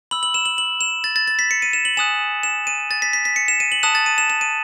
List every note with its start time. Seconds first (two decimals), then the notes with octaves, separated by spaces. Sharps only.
0.11 B5 E6 F#7
0.23 F#7
0.34 E7
0.45 F#7
0.58 F#7
0.81 E7
1.04 A6
1.16 A6
1.28 A6
1.39 B6
1.51 C#7
1.62 D#7
1.73 E7
1.85 F#7
1.97 G#5 D#6 F#6 E7
2.43 E7
2.67 D#7
2.91 A6
3.02 B6
3.13 B6
3.25 B6
3.36 C#7
3.48 E7
3.60 D#7
3.72 F#7
3.83 A5 D#6 F#6 E7
3.95 A6
4.06 D#7
4.18 E7
4.30 E7
4.41 D#7